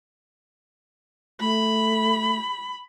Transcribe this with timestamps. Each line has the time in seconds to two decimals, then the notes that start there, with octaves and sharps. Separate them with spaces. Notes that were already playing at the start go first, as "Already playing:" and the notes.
1.40 A3 B5